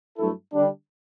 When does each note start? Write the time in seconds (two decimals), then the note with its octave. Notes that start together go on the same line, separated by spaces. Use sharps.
0.18 G2 F#3 A3 E4 A4
0.53 D3 G3 D4